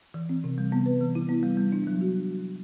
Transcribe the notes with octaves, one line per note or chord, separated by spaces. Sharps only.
E3
C4
C3
G3
B3
B4
E3
E4
B3
G3
G3
D4
F#3
F#4